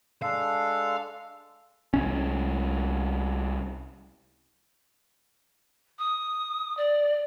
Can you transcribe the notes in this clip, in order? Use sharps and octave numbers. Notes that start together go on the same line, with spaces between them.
G#3 D4 A4 F5
C2 C#4
D#6
D5